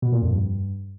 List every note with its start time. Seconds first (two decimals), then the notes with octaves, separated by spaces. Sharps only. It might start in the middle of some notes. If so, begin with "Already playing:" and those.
0.02 B2
0.12 A#2
0.22 F2
0.32 G2